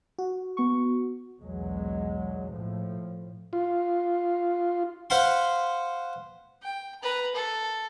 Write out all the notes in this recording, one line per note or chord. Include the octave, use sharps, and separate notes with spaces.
F#4
B3 C#6
B1 E2 F#3 G#3
A2 F3
F4
B4 C5 F5 F#5 B5 C6
G5
B4 A#5
A4